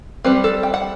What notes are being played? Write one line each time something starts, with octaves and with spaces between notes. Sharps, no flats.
G3 C4 B4
A4
G5
F#5